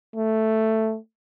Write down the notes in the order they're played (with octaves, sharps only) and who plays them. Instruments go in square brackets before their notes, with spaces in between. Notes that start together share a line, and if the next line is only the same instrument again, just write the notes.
[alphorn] A3